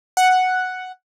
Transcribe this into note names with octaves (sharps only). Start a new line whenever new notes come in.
F#5